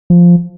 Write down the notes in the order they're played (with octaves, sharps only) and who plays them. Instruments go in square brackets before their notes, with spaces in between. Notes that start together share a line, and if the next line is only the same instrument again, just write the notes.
[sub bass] F3